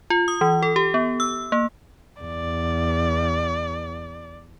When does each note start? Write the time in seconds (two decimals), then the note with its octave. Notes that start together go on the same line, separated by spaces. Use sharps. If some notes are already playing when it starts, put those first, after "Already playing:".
0.10 F4
0.28 D#6
0.41 E3
0.63 A4
0.76 G4
0.94 B3
1.20 E6
1.52 A#3
2.22 E2 D5